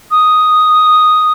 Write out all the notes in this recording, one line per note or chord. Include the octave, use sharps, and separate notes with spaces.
D#6